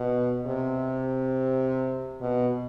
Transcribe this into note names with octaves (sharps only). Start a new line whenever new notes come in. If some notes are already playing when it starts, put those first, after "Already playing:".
Already playing: B2
C3
B2